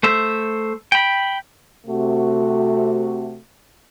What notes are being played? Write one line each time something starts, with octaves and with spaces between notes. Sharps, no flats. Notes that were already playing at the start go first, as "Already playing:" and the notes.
A3 C5 E5
G5 B5
C3 A3 F#4